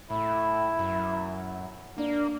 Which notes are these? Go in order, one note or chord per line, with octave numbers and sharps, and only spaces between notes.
A2 E4
F#2
A#3 D4